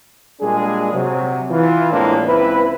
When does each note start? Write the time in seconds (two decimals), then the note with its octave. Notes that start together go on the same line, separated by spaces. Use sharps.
0.41 A#2 G3 G#3 D4 G#4
0.94 C3 F#3
1.51 E3 F4
1.92 A2 E3 G#3 A#3 C4 D4
2.25 C#2 C4 E4 B4